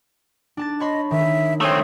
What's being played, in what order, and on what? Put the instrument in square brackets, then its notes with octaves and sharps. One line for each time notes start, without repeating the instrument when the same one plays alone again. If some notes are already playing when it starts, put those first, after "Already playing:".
[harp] D4 A5 A6
[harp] C#5 B5 C6 [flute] D#5
[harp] D#3 [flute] E5
[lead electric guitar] A3 C4 [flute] C#5 [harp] D#6 D#7